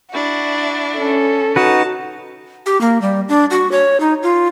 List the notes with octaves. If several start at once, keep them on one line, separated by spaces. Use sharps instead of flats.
D4 E4 F#4
C#4 A4
D#4 F#4 B4 A5
G4
A#3
G3
D4
F#4
C#5
D#4
F4